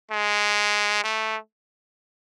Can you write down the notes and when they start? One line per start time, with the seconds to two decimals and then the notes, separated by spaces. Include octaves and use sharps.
0.12 G#3
1.04 A3